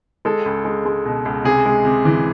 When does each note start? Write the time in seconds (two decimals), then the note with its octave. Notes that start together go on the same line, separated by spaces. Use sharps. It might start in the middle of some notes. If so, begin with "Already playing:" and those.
0.25 G#3 A4
0.46 C#2
0.65 G#3
0.85 G#3
1.05 B2
1.25 C#2
1.45 C3 G#4
1.66 G#3
1.85 C3
2.05 E3